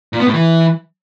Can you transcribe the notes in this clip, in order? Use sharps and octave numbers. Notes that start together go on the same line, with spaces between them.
A#2
B3
A2
E3